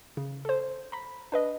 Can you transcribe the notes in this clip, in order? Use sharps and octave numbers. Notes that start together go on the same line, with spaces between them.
C#3
A4 C5
A#5 B5
D4 B4 D#5